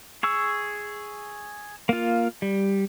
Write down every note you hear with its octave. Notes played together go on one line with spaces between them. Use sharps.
G#4 C#6 E6
A#3 F4
G3